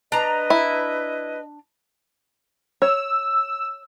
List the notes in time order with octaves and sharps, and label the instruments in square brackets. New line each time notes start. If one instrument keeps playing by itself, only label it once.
[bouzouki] D4 A#5 [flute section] B4 D#5
[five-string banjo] E4
[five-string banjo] C#5 [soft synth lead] E6